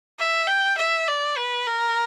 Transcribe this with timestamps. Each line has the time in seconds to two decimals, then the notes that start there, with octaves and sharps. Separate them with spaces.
0.19 E5
0.47 G5
0.78 E5
1.08 D5
1.37 B4
1.67 A#4